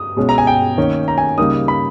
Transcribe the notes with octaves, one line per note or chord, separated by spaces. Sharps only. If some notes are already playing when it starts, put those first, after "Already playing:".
Already playing: D#6
B2 G#3 C#4
A#5
G#5
G5
D#3 A#3 C#4
A#5
G#5
C#3 G3 A#3 D#4 D#6
B5